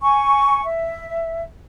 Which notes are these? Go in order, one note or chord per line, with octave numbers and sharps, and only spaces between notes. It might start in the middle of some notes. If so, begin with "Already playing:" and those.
G#5 C#6
E5